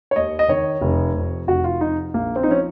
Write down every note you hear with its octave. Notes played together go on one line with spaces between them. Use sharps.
C#5
D#2 D#5
D#5
D#3 C#5
F1
F2 C3
F1 F#4
F4
F2 C3 D#4
A#1 A#3
C4
D#4
F3 C#4